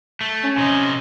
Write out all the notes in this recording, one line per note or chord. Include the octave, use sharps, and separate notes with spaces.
A3
C#4
C3 D#4